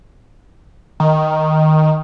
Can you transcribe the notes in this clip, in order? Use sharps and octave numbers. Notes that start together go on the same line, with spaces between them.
D#3